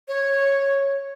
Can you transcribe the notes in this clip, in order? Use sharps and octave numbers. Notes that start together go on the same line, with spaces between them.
C#5